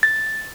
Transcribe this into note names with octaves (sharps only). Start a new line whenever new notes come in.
A6